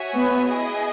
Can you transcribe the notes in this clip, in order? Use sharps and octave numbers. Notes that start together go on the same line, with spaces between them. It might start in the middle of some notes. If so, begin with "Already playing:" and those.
Already playing: F#4 C#5 E5 G#5
B3
E4 G#4 D#5 G#5